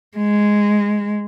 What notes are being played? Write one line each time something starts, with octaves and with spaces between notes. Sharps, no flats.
G#3